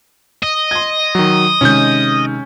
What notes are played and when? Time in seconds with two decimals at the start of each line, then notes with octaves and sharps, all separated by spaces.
0.43 D#5
0.71 C6 G#6
1.15 D#3 F#3
1.61 C3 D#3 G#3 C#4 G6